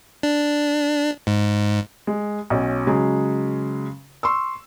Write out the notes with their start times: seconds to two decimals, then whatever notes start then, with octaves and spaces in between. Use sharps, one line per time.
0.23 D4
1.27 G#2
2.07 G#3
2.50 B1 C#4
2.87 C#3 F#3 G#3
4.23 C6 C#6 E6